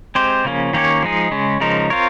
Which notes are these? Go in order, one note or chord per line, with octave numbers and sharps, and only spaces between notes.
G#3 C4 G4 C5
C#3 F3 A#3 C#4
D#3 A#3 C#4 G4 C#5
F3 G#3 D#4 G#4
C#3 G#3 C#4
C#3 F3 G#3 D#4 A#4
C4 F4 A#4 C#5